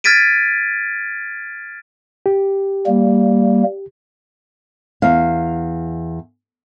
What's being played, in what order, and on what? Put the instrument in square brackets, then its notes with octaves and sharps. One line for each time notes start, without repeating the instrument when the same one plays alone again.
[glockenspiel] F6 G#6 A6 B6 D7 D#7
[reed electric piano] G4
[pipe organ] G3 A#3
[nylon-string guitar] E2 F5